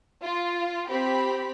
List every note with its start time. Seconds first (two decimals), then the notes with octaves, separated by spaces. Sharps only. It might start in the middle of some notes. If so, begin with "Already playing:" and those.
0.23 F4
0.89 C4 G4 B5